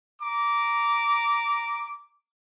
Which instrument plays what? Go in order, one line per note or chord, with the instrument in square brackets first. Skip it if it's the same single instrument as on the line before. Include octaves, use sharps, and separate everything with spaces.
[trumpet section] A#5 D6